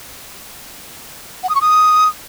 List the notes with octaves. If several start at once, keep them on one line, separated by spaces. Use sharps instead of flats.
F#5
D#6
C#6
D#6